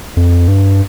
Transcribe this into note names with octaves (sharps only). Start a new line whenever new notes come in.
F2
G2